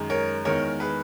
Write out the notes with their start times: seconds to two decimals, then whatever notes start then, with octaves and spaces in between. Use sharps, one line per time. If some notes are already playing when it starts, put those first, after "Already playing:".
Already playing: F#2 D#3 G#3
0.10 A#4 C#5
0.45 E2 D#3 G#3 A#4 C#5
0.80 G#4 B4